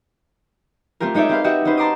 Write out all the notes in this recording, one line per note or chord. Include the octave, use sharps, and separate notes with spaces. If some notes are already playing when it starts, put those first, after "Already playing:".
A3 C4 F4 G4 A#4
G#3 D#4 C#5 D5 E5
C4 G4 B4 F5
F#4 G4 D#5 E5 F#5
C4 C#4 D#4 B4 C5
A5 A#5 C6 D6 D#6